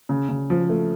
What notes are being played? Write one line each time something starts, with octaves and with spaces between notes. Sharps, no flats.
C#3
C#3
F3
A3